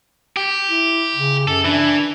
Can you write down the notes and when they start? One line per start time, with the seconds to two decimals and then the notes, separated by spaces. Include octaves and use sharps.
0.37 G4
0.68 E4
1.15 C#3
1.48 F#2 A4
1.65 E3 D4